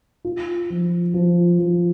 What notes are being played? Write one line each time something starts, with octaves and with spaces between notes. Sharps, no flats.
F4
F3
F3
F3